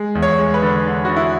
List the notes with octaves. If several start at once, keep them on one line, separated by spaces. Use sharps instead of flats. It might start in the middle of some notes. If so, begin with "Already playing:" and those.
Already playing: G#3
E2
C#5
G#3
B4
D3
D3
D3 F#4
E4